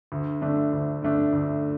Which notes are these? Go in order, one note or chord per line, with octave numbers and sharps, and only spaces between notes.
D2
D3 A3 D4
D2
D3 A3 D4
D2